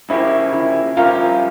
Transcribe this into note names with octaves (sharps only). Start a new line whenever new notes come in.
C#3 F3 A#3 C#4 E4 G4
E4
G2 F3 C#4 F4 G4 A#4